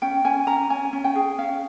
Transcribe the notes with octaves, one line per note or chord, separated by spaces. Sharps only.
C#4 G5
C#4 G#5
C#4 A#5
C#4 G#5
C#4
G5
G#4
C#4 F5